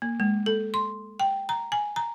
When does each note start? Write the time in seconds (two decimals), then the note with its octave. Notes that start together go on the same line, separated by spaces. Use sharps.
0.02 A#3
0.20 G#3
0.46 A4
0.74 C6
1.20 G5
1.49 A#5
1.72 G#5
1.96 A#5